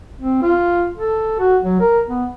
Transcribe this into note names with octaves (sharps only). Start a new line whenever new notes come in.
C4
F4
A4
F#4
F#3
A#4
B3